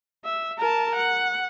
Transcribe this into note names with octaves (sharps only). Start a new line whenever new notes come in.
E5
A#4 A5
F#5